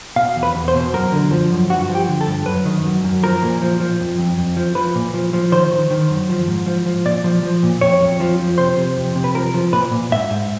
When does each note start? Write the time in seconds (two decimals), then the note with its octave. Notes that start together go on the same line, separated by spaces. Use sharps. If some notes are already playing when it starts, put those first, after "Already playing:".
0.16 B2 F5
0.36 E2
0.43 B4
0.56 E2
0.68 C5
0.75 B2
0.93 F#2 A#4
1.13 D3
1.31 F3
1.51 F#2
1.70 G2 F#4
1.89 F3
1.95 G4
2.08 D3
2.21 A4
2.27 G2
2.46 F#2 B4
2.65 D#3
2.85 F#2
3.04 F#2
3.23 F3 A#4
3.42 A#2
3.62 F3
3.80 F3
4.00 F2
4.19 F2
4.38 F2
4.57 F3
4.75 F3 B4
4.95 A#2
5.14 F3
5.33 F3
5.52 D#3 C5
5.71 D#3
5.90 D#3
6.09 F#2
6.29 F3
6.48 G#2
6.66 F3
6.86 F3
7.06 A#2 D5
7.24 F3
7.43 F3
7.63 A#2
7.81 F2 C#5
8.01 F2
8.20 F3
8.39 F3
8.58 C3 C5
8.77 C3
8.97 F2
9.16 C3
9.24 B4
9.35 F3 A#4
9.54 F3
9.73 A#2 B4
9.92 A#2
10.12 G#2 E5
10.30 G#2